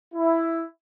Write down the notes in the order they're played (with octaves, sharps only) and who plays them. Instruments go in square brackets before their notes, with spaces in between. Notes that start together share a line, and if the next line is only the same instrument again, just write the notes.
[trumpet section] E4